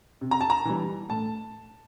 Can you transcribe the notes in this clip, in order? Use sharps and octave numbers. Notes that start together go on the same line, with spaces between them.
C3
A#5
A5
A#5
E3 G3
A2 A5